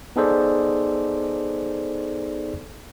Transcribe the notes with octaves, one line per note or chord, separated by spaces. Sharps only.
B3 D#4 G#4 A4 C5 D5